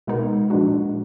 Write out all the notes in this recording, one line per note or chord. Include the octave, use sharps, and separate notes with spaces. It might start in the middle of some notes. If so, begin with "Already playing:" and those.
B2 G#3 B3 D#4 A#4
A#2 F3 G#3 D4 F#4